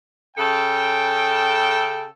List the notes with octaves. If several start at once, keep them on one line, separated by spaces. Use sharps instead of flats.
C#3 A4 G5